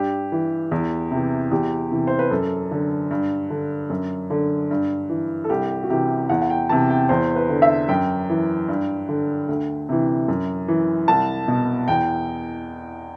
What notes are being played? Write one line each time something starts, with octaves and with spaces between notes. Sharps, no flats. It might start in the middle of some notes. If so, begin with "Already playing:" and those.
Already playing: G2 G4
E3
E2
C3 E3
E2 G4
C3 E3
C5
B4
F#2 A4
D3
G2
D3
F#2
D3
G2
E3
A4
C2 G4
F#4
C3 E3 G4
E2 F#5
F#5
G5
C3 E3 A5
G5
E2 C5
B4
D3
E5
F#2 G5
E3
G2
D3
D2
C3 E3
F#2
E3
C2 A5
B2
E2 G5